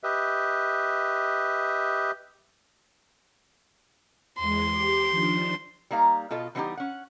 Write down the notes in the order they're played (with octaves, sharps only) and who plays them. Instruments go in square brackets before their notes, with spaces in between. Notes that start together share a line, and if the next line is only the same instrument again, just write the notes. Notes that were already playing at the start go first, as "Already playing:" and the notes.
[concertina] G4 B4 D#5 E5
[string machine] E2 G#3 [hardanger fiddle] C6
[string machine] G4 D6
D#3 F3 D4
[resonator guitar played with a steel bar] G3 A#3 D#4 F5 A#5
B2 F4 A4 D#5
E3 G3 B3 C#4 D#4 G4
C#4 F#5